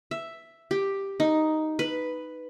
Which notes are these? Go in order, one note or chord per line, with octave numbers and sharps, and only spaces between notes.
E5
G4
D#4
B4